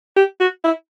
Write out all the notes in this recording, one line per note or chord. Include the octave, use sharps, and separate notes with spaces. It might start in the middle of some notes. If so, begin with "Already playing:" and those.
G4
F#4
E4